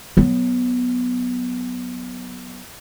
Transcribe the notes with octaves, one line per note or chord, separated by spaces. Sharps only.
F#3 B3